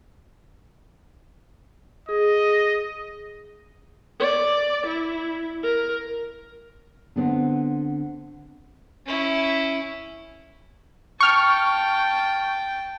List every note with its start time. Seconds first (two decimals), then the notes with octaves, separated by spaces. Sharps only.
2.09 G#4 D#5
4.19 D5
4.86 E4
5.63 A#4
7.16 D3 B3 C4
9.06 C#4 E4
11.20 G5 A5 C#6 F6